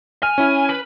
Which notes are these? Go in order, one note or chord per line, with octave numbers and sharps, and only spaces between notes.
G#5 F6
C#4 E4
B4